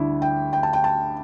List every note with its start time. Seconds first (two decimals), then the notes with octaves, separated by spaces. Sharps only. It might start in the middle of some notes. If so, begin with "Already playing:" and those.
Already playing: D2 D3 G3 D4 E4
0.22 G5
0.53 G5
0.63 A5
0.73 G5
0.84 A5